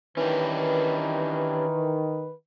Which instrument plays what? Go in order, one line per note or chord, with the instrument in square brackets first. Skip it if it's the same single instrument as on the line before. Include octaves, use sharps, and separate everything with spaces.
[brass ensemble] D#3 [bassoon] E3 [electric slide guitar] C#4 D4 G4 [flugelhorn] B4